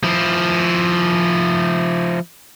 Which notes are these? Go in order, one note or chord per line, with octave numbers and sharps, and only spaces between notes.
F3 E4